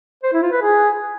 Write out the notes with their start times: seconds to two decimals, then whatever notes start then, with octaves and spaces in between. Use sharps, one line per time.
0.23 C5
0.33 E4
0.42 F4
0.52 B4
0.62 G#4